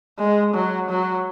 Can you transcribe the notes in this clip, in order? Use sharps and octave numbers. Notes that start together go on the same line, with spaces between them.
G#3
F#3
F#3